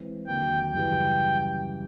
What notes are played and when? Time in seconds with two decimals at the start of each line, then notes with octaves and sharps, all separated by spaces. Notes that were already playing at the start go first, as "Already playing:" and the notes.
Already playing: E3 G#3 C4
0.27 D#2 D3 F#3 A#3 G5
0.73 F#2 C#3 E3 G3 G5